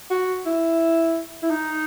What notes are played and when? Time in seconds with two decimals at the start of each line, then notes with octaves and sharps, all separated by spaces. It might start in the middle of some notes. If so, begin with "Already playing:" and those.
0.11 F#4
0.46 E4
1.43 E4
1.50 D#4